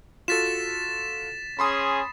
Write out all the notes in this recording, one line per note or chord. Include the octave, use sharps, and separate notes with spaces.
F4 F#4 A4 A6 B6 E7
C#4 G#4 B5 C6 D#6